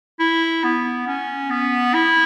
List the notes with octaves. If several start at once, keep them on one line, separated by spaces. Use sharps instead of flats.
E4
B3
C#4
B3
E4